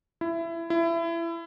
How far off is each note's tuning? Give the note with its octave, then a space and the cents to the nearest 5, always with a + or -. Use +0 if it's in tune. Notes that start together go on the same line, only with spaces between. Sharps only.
E4 +20
E4 +25